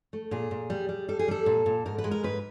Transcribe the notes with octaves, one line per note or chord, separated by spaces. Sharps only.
A3
A#2 G#4
A#2
G3
G3
G3 A4
G#4
G3 A4
A#2
A#2
G#2 A#4
B4
G#3
A#4
G#2 B4